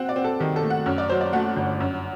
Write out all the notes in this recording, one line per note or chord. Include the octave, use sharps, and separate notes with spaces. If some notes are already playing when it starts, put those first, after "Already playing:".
Already playing: C4 F#5
D5
C4
A4
D#3 G4
A4
A3
F#5
F#2
D5
F#3 C5
D5
A3 F#5
G1
F#2